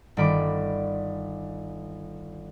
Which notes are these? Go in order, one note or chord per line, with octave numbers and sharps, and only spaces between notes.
G1 D#3 D5 B5 D6